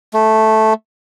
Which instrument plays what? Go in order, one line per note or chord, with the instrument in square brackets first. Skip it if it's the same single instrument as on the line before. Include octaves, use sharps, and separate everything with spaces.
[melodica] A3